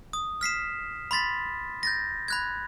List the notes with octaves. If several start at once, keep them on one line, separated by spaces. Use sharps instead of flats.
D#6
F6 B6 C7 E7
B5 C6 A6 B6
G6 A6 A#6
B5 F#6 G#6